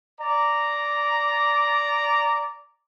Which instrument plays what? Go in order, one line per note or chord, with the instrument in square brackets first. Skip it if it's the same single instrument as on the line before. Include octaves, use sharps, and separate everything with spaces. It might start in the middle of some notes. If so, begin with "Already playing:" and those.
[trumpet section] D5 A#5 D6